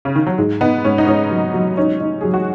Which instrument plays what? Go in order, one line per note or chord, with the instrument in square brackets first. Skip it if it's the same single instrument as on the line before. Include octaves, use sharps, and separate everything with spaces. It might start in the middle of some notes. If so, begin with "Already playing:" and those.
[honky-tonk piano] C#3
D#3
F#3
[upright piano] G#2 [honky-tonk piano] G#3
[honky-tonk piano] B3 [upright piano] D#4
[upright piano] G#2 [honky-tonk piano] C#4
[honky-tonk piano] D#4
[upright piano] G#2 [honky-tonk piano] C#4
[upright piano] F#3
F#3
[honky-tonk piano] C#4 [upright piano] D#4
[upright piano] D#4
[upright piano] F#3 [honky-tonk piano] G#4
[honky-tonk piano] F#4